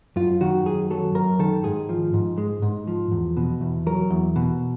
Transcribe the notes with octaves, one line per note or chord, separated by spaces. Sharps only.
F#2 F4
D#3 F#4
F#2 G#4
F#3 A4
F#2 A#4
D#3 A4
G#2 G#4
F3
G#2
G#3
G#2
F3
E2
B2
E2
F#3 A#4
E2
B2